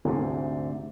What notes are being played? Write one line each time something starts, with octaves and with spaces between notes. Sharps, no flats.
D2 G#2 C3